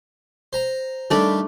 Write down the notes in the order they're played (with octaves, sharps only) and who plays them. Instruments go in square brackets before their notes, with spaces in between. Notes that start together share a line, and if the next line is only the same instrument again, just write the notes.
[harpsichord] C5 A#5
[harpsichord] D#3 G3 A4 [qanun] A3 D4 B5